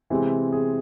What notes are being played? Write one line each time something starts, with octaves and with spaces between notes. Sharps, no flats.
C3 E3 G#3 C4
G#4